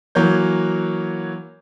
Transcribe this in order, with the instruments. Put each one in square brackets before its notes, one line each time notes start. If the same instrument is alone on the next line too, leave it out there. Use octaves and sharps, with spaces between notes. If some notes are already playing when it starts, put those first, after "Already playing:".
[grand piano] E3 F#3 A#3 C#5 G6